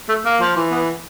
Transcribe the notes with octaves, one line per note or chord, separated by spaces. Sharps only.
A3
A#3
F3
E3
B3